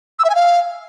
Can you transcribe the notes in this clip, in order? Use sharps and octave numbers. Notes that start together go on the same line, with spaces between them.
E6
E5
G#5
F5